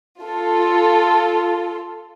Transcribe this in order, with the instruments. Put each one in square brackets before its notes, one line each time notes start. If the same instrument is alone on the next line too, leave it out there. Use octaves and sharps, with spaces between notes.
[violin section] F4 A4